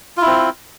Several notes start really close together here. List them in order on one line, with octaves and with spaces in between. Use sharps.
F4 E4 C4